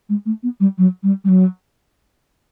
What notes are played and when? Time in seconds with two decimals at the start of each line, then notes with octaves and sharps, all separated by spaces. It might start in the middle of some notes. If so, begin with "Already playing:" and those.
0.09 G#3
0.26 A3
0.43 B3
0.60 G3
0.78 F#3
1.03 G3
1.24 G3
1.29 F#3